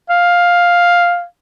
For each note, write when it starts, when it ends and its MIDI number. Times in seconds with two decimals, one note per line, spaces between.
0.10 1.24 77